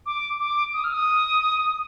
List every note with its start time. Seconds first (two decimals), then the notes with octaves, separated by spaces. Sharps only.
0.06 D6
0.40 D6
0.74 D#6
0.84 F6
0.93 D#6